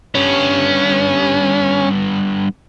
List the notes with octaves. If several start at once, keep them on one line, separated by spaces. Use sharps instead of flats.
G2 B3 C#4